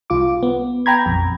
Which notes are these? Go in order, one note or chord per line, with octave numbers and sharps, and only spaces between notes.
C2 F4 D6
B3
G5 A#5 B5 G#6
A#1 F2